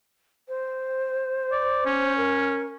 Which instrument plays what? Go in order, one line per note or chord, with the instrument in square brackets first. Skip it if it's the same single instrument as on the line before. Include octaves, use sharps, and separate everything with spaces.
[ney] C5
[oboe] D5
C#4
[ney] A#4